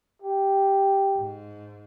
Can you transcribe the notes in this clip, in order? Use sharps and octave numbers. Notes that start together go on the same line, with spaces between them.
G4
G#2